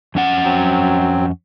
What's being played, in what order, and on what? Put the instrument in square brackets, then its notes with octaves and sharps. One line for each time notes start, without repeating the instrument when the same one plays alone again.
[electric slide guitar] F2 C#4 F#5
[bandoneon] F#3 C4